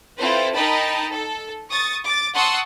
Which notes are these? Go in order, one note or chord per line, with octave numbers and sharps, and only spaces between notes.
C4 E4 F4 A4 B4 C5
D#4 A#4 D#5 G5 A5 B5
A4
C#6 D#6 A6
D6 A6
F#5 A5 C6 C#6 D#6 E6